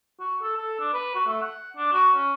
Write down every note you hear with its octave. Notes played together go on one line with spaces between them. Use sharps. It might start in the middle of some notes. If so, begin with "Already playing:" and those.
F#4
A4
A4
D4
B4
F#4
A3
F#5
D4
F#4
C#4